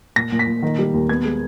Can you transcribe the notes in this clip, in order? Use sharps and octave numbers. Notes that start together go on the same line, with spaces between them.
A#2 A#6
A#2
B6
A#2
D#3
G3
D#2
B3 G#6
G#3